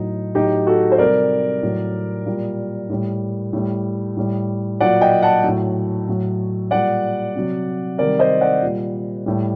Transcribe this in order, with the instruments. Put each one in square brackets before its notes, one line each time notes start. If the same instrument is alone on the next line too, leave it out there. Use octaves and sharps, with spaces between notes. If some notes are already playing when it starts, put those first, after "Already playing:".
Already playing: [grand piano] A2 F#3 D#4
A2 F#3 D#4 G4
F#4 A4
C5
C3 G3 A#4 D5
A2 F#3
A#2 G3
A2 G3
A2 G3
A2 G3
A#2 F#3 D5 F#5
D#5 G5
F#5 A5
A2 F#3
A2 F#3
A#2 G3 D5 F#5
C3 F#3
C3 D#3 G3 A#4 D5
C5 D#5
D5 F#5
A#2 G3
A2 G3